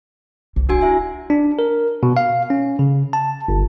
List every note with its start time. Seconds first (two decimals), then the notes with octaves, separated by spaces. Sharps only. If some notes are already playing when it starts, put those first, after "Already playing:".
0.56 C2
0.69 D1 D4 F#4 G#5
0.81 E4 E5 G#5
1.30 D4
1.59 A#4
2.03 B2
2.17 F5
2.50 C#4
2.79 C#3
3.13 A5
3.48 G1